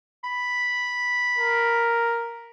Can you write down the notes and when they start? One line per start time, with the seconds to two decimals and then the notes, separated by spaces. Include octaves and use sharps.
0.24 B5
1.38 A#4